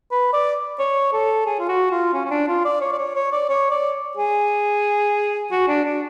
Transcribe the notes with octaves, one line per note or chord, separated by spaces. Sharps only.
B4
D5
C#5
A4
G#4
F4
F#4
F4
C#4
C#4
D4
F4
D5
C#5
D5
C#5
C#5
D5
C#5
D5
G#4
F#4
D4
D4